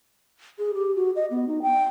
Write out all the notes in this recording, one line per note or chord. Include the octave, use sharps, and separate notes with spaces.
G#4
G4
F#4
D#5
B3
D#4
G5